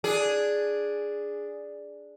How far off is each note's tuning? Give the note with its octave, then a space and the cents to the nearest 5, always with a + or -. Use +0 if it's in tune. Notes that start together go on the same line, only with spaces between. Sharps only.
D4 +0 G#4 +0